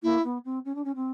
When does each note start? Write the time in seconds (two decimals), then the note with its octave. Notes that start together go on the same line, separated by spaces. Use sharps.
0.03 A#3 E4
0.24 B3
0.45 C4
0.65 C#4
0.75 D4
0.84 C#4
0.95 C4